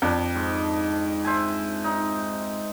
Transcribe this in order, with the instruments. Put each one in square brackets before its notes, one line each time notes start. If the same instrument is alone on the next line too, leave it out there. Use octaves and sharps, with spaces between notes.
[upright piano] F2 [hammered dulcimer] D4
[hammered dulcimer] G#2
C5 E5 G#5
D#4